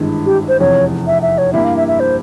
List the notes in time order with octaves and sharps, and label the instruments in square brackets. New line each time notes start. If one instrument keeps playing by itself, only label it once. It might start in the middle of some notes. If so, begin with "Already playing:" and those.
Already playing: [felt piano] G#1 G2 E3 G#3 E4
[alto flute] G4
C5
[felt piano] F1 E2 C3 [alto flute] C#5
[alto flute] E5
E5
C#5
[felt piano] G2 G3 A#3 E4 G4 [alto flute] E5
[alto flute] F5
E5
E5
C5